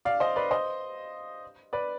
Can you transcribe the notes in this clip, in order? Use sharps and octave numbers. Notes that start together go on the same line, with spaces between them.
D5 F5
C5 D#5
B4 D5
C5 D#5
B4 D5